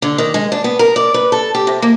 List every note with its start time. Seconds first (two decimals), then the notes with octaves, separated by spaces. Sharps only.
0.02 D3
0.18 D#3
0.34 G#3
0.52 D4
0.64 B3
0.79 A#4
0.96 D5
1.14 B4
1.32 A4
1.55 G4
1.67 C3
1.82 A#3